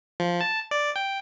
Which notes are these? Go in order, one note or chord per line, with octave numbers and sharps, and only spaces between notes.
F3
A5
D5
G5